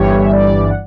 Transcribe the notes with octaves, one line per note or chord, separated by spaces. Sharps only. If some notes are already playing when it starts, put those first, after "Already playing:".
Already playing: G1 G2 E3 G3 C#5
E5
D5
F#5